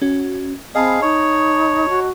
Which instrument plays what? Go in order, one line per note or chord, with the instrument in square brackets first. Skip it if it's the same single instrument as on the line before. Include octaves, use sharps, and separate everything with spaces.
[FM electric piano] C#4 F#4
[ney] C4 [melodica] G#4 F5 [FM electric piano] D#5 A5 B5
[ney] D#4 [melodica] C#5
[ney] F#4